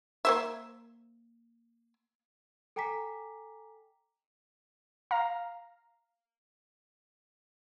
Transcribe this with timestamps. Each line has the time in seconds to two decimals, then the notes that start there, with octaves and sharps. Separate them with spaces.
0.25 A#3 C5 E5
2.76 A4 G5 G#5 A#5 D6 B6
5.11 F5 A#5